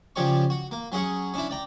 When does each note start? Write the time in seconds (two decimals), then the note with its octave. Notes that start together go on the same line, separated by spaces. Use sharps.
0.16 C#3 F3 G4 C#5 D5 C#6
0.50 F#4
0.71 A#3
0.92 F#3 C#4 G#4 F#5 C#6
1.34 C#4 D4 E4
1.50 D5 G5 A#5